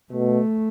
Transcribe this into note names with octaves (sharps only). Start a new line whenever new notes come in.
B2 A3